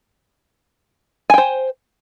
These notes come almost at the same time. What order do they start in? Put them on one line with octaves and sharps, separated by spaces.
G#5 G5 C5